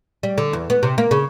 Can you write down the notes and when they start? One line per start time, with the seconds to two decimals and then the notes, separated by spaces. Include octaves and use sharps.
0.23 G3
0.38 D3
0.53 E2
0.70 B3
0.83 C3
0.98 A#3
1.11 C#3